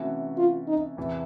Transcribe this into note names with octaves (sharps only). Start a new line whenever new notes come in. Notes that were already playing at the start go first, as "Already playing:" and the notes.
Already playing: C3 E3 A3 C#4 F#4
F4
D#4
E2 C3 E3